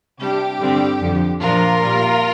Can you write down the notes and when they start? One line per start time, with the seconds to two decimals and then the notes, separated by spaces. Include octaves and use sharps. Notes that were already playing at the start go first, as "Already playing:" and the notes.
0.20 C3 G3 D4 G4
0.60 G2 D3 G3 C4
1.01 F2 D3 F3
1.41 A#2 F3 D4 F4 A#4
1.81 A#2 G3 A#3